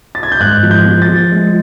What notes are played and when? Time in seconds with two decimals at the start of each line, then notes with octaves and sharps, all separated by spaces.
0.15 A6
0.23 G#6
0.32 G6
0.40 G#2 F#6
0.63 F3
0.71 G6
0.85 F3
1.02 A6
1.08 F3
1.32 G#3